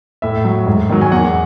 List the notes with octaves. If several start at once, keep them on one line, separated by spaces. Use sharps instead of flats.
A2 E5
F#3
G#2
D#3 F#3
G#5
E2 F#5